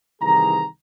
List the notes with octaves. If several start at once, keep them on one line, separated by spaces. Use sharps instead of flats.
C2 D#3 E3 G#4 A#5